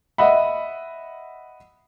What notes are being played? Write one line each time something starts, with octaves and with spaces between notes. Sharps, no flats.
D#5 E5 F#5 B5